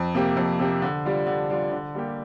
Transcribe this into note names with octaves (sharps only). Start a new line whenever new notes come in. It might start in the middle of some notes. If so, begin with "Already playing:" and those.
Already playing: F2
C3 A#3 G4
F2
C3 A#3 G4
D3
G3 D4 F4
D3
G3 D4 F4
D3
G3 A#3 G4